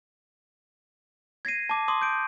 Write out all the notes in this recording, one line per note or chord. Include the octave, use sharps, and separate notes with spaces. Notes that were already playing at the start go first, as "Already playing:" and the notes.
G#6 A#6 C7 D#7
A5 D6
C6 D6 D#6
G6 D7